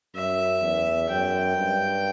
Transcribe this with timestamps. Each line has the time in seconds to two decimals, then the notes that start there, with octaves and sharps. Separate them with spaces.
0.15 F#2 E5
0.62 E2
1.09 F#2 G5
1.57 G2